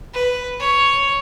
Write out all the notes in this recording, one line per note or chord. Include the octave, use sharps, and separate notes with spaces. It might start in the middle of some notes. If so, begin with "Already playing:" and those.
B4
C#5